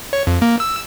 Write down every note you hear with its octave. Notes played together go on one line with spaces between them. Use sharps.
C#5
F2
A#3
E6